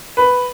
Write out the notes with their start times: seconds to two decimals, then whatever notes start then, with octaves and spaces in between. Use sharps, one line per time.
0.17 B4